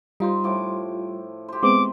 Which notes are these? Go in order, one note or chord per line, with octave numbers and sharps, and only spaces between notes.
G3 D#4 F4 C5
A2 F3 D6
G4 C5
G#3 B3 C4 D6